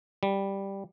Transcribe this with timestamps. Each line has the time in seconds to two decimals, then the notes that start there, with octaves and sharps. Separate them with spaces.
0.23 G3